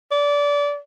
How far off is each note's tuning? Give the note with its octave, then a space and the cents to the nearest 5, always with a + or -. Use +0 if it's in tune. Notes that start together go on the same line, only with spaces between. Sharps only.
D5 -25